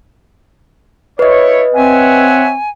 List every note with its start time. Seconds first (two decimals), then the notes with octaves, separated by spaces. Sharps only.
1.19 E4 B4 C#5 D#5
1.74 C4 C#5 E5 F#5 G#5